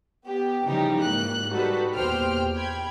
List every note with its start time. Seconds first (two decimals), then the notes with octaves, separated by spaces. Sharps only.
0.24 B3 G4
0.67 C#3 E3 F3 G3 D#4 G4
1.02 G#2 A#3 F#6
1.51 G3 D#4 F#4 G4 A4 B4
1.94 E2 A#2 G4 C5 G5 F6
2.55 G5 B5 G#6